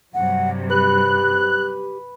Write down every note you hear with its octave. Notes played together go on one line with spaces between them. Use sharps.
G2 C3 F#3 F#5
G4 B4 F#6